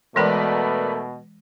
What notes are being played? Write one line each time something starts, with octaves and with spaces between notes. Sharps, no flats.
B2 E3 G#3 A3 A#4 B4 D5